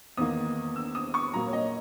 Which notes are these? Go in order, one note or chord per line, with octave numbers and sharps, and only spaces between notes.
E2 D#3 A#3 D#6
E6
D#6
C#6
A#2 F#3 A#3 A#5
C#5
D#5